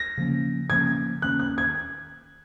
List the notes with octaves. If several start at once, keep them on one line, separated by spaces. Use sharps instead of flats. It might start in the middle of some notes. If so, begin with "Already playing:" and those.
Already playing: A#6
C#3 F3 A#3 C#4
C#3 F3 A#3 C#4 G#6
D#3 A#3 C#4 F#6
F#6
G#6